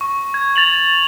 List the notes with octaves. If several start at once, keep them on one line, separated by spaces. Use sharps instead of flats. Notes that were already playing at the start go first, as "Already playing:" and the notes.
C#6
G#6
A6 F7 F#7